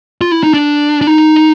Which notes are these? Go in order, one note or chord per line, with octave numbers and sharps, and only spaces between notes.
F4
E4
D#4
D4
D4
D#4